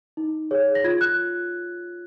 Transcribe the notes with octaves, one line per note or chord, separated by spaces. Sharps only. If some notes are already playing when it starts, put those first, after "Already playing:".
D#4
G#4 C#5
A#6
F4 G#6
F#6